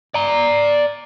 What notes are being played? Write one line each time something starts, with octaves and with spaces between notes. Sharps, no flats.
D5 A#5